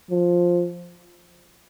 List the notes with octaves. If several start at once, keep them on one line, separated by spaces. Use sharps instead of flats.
F3